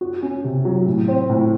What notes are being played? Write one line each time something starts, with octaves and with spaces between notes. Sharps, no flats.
F#4
C#4
C3
F#3
A2
C4
A2